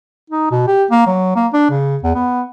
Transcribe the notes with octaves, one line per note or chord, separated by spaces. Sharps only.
D#4
B2
G4
A#3
F#3
A#3
D4
C#3
E2
B3